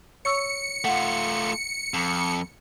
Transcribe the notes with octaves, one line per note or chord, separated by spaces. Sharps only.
C#5 C#6 E6 C#7
A3 F4 F#5
F2